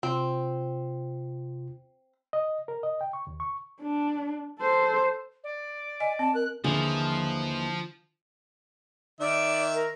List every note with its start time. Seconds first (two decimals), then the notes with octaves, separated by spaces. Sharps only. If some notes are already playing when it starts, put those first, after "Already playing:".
0.03 C3 C4 F4
2.33 D#5
2.68 A#4
2.83 D#5
3.01 G5
3.13 C#6
3.27 D#2
3.40 C#6
3.82 D4
4.60 A4 C5
5.44 D5
6.00 D#5 G#5
6.19 C4 A5
6.35 A#4 F#6
6.64 D#2 D3 E3 F3 G#4
9.20 D#3 D5 E5
9.74 A#4